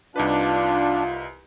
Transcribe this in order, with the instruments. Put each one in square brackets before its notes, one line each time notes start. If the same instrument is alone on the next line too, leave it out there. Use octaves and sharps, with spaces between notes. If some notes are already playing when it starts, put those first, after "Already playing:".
[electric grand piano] C2 D#4 B4 [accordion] D4 [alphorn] F4